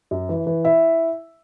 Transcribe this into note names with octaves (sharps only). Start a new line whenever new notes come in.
F#2
E3
E3
E4 E5